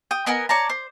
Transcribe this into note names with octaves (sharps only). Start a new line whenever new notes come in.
G5 D#6
B3 A#4 D#5 G#5
C#5 D5 A5 A#5
C5